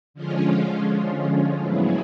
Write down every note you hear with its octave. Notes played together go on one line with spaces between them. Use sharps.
D3 F3 G#3 C#4 F4
A2 F#3 B3 E4 G#4